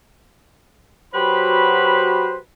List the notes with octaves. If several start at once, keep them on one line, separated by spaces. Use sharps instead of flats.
F#3 F#4 G4 B4 C5 B5